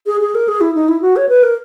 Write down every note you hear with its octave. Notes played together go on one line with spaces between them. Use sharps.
G#4
G#4
A#4
G#4
E4
D#4
E4
F#4
C#5
B4
A#4